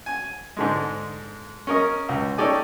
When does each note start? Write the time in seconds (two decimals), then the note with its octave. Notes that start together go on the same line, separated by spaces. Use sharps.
0.06 G#5
0.57 G#2 D3 G#3
1.67 C#4 A#4 D#5
2.09 C#2
2.38 C#4 D#4 G4 A4 D5 G#5